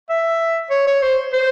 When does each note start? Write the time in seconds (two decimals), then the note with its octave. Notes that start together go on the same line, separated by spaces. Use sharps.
0.10 E5
0.70 C#5
0.87 C#5
1.02 C5
1.33 C5